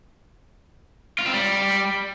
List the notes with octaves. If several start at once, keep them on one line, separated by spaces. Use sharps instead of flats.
F4
C4
G3